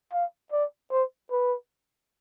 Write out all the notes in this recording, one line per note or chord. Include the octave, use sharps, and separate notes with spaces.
F5
D5
C5
B4